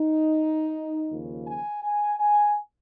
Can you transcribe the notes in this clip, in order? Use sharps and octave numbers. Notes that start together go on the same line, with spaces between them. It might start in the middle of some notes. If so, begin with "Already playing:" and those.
Already playing: D#4
D#2 C#3 F3 A#3 F4
G#5
G#5
G#5